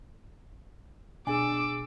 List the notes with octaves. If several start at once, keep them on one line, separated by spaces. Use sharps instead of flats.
B2 D4 G#4 G#5 D6 E6